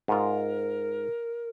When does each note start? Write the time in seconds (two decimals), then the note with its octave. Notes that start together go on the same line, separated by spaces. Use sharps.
0.08 G#2 F4 A#4